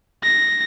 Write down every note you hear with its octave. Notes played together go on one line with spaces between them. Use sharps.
A#6